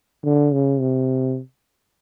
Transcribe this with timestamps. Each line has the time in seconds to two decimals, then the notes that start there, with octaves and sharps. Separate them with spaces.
0.24 D3
0.52 C#3
0.80 C3